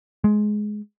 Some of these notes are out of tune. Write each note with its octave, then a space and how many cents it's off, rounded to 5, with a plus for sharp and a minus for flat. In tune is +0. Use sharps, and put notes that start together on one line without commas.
G#3 +15